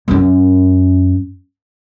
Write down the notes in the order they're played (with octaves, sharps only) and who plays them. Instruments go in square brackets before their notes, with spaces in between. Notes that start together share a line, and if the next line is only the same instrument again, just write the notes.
[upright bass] F#2 C#4